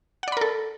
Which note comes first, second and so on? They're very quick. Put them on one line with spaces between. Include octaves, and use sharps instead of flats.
F#5 D5 B5 A#4 A4